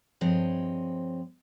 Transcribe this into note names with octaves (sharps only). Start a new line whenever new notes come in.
G2 F3 C4 G#4 C#5 D#5